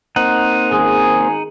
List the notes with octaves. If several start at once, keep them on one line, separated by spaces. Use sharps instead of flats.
A#3 C4 D#4 C5 F#5
G#1 D#3 G#3 C#4 G#4